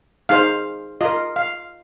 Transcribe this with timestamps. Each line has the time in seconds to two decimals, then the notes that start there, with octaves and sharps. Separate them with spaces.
0.29 D#4 G#4 C5 F5
1.01 F4 A#4 D#5
1.36 F5